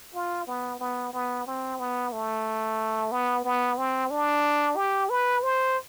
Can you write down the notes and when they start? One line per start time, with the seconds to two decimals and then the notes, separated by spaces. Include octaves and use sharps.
0.14 F4
0.47 B3
0.80 B3
1.13 B3
1.47 C4
1.80 B3
2.13 A3
3.12 B3
3.45 B3
3.78 C4
4.11 D4
4.77 G4
5.10 B4
5.43 C5